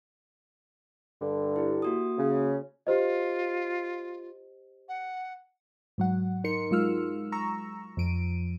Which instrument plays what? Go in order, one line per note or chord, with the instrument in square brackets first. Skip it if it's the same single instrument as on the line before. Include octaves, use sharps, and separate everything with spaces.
[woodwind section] G2 D3
[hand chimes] E4 G4
A#3 F#4 D#6
[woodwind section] C#3
[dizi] F4 [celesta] G4 C5 D#5
[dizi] F#5
[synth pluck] G#2 F#3 F#5
D#4 A#4 C6 C#7
F#3 G#3 F4 E6 F6
A#5 C#6 E6
F2 F3 D7 D#7